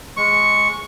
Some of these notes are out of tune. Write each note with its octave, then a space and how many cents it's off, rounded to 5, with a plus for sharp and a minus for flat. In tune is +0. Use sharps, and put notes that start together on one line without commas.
G#3 +0 C#6 +0